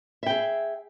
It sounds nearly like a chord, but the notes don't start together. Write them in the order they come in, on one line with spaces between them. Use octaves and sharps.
E5 G5 G#4